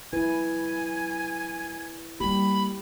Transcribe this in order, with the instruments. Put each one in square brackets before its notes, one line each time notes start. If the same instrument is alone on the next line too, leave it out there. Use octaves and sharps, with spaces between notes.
[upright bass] F#3 [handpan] E4 B4 [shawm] G#5
[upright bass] G3 A#3 [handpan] G4 [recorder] B5